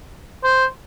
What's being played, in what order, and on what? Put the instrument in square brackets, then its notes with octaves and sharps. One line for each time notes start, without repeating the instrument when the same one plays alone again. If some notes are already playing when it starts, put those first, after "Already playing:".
[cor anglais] C5